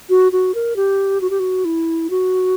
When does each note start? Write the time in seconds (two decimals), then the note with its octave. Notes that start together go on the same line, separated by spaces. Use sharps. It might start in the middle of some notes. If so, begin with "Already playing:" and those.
0.09 F#4
0.32 F#4
0.55 A#4
0.76 G4
1.21 F#4
1.30 G4
1.39 F#4
1.65 E4
2.10 F#4